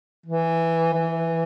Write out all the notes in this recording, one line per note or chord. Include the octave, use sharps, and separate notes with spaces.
E3
E3